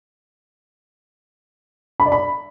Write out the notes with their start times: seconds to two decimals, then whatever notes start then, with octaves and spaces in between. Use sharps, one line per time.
2.00 B5
2.06 D5
2.12 B5